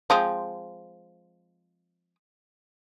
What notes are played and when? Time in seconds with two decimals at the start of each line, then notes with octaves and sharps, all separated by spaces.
0.10 F3 G#3 C4